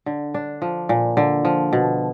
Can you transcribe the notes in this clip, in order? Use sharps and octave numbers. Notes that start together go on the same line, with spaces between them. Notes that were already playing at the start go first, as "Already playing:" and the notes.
D3
D4
F3
A#2
D3
F3
B2